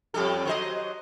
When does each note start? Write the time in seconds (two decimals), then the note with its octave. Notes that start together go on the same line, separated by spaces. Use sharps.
0.14 F2 G3 A4
0.45 F#3 C5 D#5